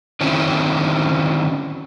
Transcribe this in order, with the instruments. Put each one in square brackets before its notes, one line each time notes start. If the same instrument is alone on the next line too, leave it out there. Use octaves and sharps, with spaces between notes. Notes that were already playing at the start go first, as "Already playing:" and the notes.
[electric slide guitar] D3 D#3 F#3 C4 C#4 E4